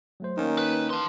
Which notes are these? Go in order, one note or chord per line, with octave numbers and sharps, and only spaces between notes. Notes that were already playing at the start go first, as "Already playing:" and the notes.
F#3 A3 C5
D#3 A#3 C#4 D#4
B4
A5 C6